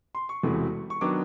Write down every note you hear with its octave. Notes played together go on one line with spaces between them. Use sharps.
C6
C#6
E1 E2 C3 E3 A3
C#6
D#3 F#3 B3 D4 D6